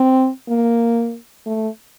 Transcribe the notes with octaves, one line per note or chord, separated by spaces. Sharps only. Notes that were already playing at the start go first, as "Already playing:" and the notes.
Already playing: C4
A#3
A3